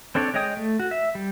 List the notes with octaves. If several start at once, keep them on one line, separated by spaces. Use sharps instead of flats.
C4 D4 A4 C#5 D5
G#3 C#5 D#5 G5 D#6
A3
F#4
E5
G3